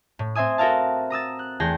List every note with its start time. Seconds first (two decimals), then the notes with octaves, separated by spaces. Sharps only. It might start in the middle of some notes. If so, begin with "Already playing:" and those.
0.19 A2
0.35 C4 C5 E5 G#5 D#6
0.58 F#4 A4 A#4 E5 F5 A5
1.10 A#5 D#6 E6 A6
1.39 F#6
1.60 E2 A3 G#4 G5 A#6